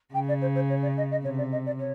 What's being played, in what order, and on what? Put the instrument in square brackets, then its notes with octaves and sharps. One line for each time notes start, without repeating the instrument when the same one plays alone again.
[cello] C#3 [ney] G5
[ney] D5
C5
C5
C#5
D5
D#5
D#5
[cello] C3 [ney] C#5
[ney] D5
D#5
D5
C#5